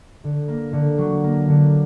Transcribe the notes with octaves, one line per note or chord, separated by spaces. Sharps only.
D3
A#3
D3
F#3
A#3
D3